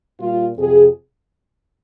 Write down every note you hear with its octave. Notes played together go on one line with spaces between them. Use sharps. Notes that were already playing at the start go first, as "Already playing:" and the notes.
A#2 G3 F4
F2 C3 F3 G#4